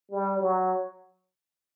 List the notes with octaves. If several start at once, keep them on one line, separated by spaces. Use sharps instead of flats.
G3
F#3